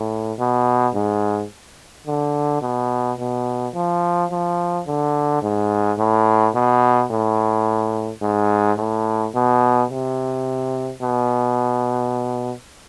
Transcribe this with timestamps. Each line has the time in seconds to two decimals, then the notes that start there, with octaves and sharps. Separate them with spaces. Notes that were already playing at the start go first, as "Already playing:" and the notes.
Already playing: A2
0.39 B2
0.94 G#2
2.07 D3
2.62 B2
3.18 B2
3.74 F3
4.31 F3
4.87 D3
5.42 G#2
5.98 A2
6.54 B2
7.11 A2
8.22 G#2
8.77 A2
9.35 B2
9.90 C3
11.02 B2